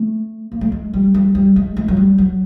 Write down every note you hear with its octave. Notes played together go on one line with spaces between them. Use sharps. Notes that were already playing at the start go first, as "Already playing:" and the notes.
Already playing: A3
A#3
A3
G#3
G3
G3
G3
G#3
G#3
F#3
G3
F#3